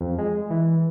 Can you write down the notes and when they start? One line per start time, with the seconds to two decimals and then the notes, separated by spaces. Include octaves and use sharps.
0.01 F2
0.18 G#3
0.50 E3